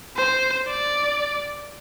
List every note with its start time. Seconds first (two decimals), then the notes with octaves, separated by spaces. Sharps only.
0.16 C5
0.67 D5